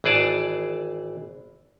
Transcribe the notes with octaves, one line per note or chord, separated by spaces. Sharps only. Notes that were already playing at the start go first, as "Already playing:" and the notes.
G#1 E3 G#4 D5 A5